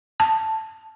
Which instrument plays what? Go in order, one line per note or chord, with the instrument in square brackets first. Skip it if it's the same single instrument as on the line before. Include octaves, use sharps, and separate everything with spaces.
[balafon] A5